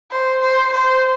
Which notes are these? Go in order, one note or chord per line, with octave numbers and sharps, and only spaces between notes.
C5
C5
C5